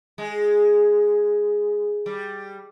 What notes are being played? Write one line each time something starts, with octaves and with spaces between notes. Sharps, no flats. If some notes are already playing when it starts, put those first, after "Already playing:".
G#3
G3